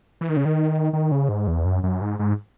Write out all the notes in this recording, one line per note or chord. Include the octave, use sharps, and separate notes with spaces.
E3
D#3
C#3
D#3
D#3
C#3
G#2
E2
F#2
F#2
G#2
G#2